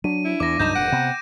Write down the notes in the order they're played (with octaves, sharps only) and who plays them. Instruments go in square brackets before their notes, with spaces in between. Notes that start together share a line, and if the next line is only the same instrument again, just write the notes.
[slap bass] F#3 [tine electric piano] D4 [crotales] D#7
[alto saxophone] E4
[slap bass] E2 [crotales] D6 A#6
[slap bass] C#2 G2 F#3 [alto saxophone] D#4 [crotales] G6 E7
[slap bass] F1 G#2 B2 [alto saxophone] F#5 [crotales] D7
[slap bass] C3 B3 [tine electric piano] G5